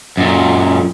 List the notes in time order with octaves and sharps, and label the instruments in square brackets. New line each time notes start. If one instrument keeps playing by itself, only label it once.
[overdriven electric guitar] F#2 A#2